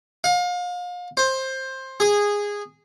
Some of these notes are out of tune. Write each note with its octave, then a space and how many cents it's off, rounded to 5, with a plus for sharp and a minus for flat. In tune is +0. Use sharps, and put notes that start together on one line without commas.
F5 +35
C5 +15
G#4 -15